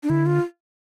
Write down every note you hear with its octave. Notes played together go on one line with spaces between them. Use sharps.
D4
D3 E4
F4